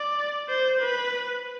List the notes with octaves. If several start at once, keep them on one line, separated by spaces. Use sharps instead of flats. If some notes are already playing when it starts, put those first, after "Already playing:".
Already playing: D5
C5
B4